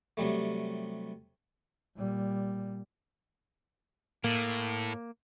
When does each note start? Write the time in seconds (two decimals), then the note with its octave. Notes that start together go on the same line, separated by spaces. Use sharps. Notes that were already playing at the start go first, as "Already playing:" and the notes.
0.17 C3 F#3 G3 A3
1.97 A#2 G3
4.24 A2 A#3